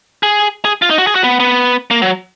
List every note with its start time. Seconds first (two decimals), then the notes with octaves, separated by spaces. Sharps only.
0.23 G#4
0.65 G#4
0.82 F4
0.90 D#4
0.98 F#4
1.07 G#4
1.15 F#4
1.24 B3
1.40 B3
1.91 A#3
2.02 F#3